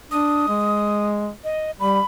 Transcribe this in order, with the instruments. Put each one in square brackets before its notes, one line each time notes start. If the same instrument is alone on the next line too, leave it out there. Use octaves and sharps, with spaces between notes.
[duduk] D4 [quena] D#6
[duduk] G#3
[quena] D#5
[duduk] G3 [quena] B5